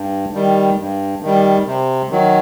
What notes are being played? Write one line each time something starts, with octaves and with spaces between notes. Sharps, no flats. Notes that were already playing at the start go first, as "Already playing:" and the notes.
Already playing: G2
D#3 G3
G2
D#3 G3
C3
D#3 F#3